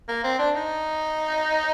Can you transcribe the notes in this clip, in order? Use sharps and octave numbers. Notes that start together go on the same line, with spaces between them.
A#3
C4
D4
D#4